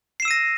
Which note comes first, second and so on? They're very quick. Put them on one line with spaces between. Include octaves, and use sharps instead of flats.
C7 E7 E6 D#7 A#6